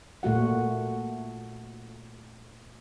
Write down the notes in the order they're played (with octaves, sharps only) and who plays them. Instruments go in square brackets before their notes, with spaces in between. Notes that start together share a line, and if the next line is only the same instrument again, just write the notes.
[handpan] A#2 A3 F#4 F#5